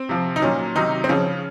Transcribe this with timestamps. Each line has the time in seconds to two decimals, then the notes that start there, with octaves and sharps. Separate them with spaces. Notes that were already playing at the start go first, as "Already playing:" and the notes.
Already playing: C4
0.09 C3 F3
0.36 D#4
0.42 A#2 F#3 C#4
0.75 C3 D#3 F#3 D#4
1.04 C4
1.09 C#3 F3 C#4